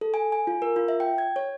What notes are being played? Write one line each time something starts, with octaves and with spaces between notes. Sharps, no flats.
A4
G#5
G#5
F4
A#4
F4
E5
G5
G#6
C#5